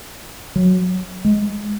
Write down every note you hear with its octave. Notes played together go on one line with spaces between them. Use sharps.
F#3
G#3